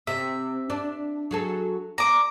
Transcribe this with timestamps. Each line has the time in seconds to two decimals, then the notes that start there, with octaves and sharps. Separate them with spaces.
0.07 C3 E5
0.70 D4
1.31 F#3 G#4 A4
1.98 D5 A#5 D6